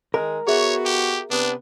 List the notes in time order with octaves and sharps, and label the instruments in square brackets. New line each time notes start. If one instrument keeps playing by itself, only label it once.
[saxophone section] D#3 G#3 [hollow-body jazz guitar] A#4
[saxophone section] B3 F#4 [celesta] G#4 E5 [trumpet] C#5
[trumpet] G4
[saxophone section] C3 B3 [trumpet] D4